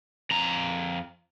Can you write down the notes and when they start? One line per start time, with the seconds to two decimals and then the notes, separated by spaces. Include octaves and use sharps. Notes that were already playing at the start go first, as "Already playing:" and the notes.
0.31 F2 A#5